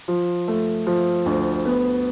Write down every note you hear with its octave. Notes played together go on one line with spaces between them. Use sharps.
F3
A3
F3
D2
B3